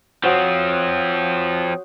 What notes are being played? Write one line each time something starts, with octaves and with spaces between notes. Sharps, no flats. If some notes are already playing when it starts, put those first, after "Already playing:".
F3 C4 F#4 C5 C#5 F#5 D#6